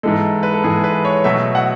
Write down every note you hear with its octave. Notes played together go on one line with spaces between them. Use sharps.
G#2 E3 G#3 A4
B4
A4
G#2 E3 G#3 G#4
B4
C#5
B2 F#3 A3 E5
F#5